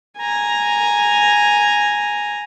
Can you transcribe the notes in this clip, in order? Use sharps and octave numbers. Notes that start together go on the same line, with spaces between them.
G#5 A#5